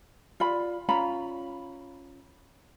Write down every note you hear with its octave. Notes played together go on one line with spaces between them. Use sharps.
F4 D5 B5
C#4 F4 A#5 B5